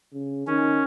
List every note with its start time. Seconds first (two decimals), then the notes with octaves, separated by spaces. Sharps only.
0.12 C#3
0.47 D#3 C#4